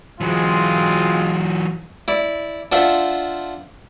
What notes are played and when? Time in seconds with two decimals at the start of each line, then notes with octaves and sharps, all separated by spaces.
0.21 E3 F#3 G#3 C4 F4
2.08 E4 D5
2.72 D4 F4 C5 E5 F#5